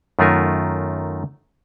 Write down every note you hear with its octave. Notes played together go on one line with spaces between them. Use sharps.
F#2 D#3 A3 F4 A#4 G#5